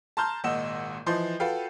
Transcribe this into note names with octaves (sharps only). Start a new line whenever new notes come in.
A5 A#5 C6 F6 G6
G#1 A#2 D#5 F#5 E6 E7
E3 F3 D#5 C6 G6
F4 F#4 A4 B4 F5 G5